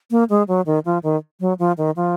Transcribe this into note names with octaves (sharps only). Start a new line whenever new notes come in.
A#3
G#3
F#3
D#3
F3
D#3
F#3
F3
D#3
F3